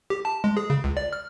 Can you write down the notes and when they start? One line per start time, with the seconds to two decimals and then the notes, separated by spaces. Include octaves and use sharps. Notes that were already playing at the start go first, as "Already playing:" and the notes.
0.10 G4
0.25 A5
0.44 G#3
0.57 G#4
0.70 C#3
0.84 C#2
0.97 D5
1.13 F6